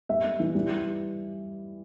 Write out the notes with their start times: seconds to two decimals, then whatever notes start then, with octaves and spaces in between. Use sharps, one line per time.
0.09 G3 E5
0.24 G3
0.40 E3
0.55 G3
0.70 G3